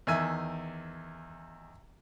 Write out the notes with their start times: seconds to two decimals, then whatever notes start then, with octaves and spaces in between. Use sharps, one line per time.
0.07 E2 D#3 E5 G#5 E6